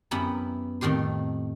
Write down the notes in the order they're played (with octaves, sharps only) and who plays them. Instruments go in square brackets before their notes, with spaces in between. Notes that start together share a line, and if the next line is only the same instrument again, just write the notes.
[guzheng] F#2 B3 E4 G4 A#5 B5
F2 A2 D#3 G4 C6